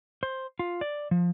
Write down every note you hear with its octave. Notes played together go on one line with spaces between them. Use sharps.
C5
F4
D5
F3